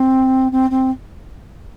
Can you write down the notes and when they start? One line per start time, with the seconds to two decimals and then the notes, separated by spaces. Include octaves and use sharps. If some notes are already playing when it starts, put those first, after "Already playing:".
Already playing: C4
0.52 C4
0.70 C4